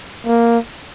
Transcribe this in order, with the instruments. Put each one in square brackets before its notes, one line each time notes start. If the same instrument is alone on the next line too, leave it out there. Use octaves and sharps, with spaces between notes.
[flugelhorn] A#3